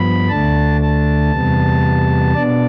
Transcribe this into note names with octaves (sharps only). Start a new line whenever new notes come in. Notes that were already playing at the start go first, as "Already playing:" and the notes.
Already playing: G2 F3 B3 B5
D2 D3 A3 D4 A5
A5
E2 C3 G3 B3
B2 B3 D4 D5